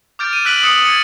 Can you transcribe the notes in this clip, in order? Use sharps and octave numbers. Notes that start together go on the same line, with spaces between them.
D6 F6 G6 A6 D7
D#7
E6 F#6 B6 D7 F#7
D#6 A6 C#7 E7
G#6 A6 C#7 F#7